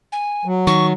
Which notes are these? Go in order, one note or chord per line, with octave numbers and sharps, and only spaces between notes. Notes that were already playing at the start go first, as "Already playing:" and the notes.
G#5
F#3
D#3 C#6